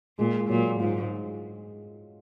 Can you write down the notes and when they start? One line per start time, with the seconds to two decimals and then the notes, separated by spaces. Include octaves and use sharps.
0.18 A#2 G#3
0.49 A#2 F#3
0.80 G#2 F4